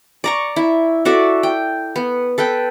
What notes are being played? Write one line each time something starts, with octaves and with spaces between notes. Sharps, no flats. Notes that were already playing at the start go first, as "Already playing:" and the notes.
D5 A#5 C#6
E4
F#4 A4 D5 E5
G5
B3
A4 B4 G5